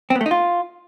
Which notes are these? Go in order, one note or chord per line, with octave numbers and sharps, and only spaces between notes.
C4
B3
A3
D#4
F4